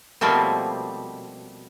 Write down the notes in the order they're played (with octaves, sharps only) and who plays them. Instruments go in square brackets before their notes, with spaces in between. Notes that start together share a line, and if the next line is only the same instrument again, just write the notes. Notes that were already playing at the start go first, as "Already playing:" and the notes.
[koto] B2 F3 G3 A3 A#3 C4